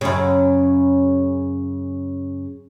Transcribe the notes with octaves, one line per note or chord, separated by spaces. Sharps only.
F#2 C#3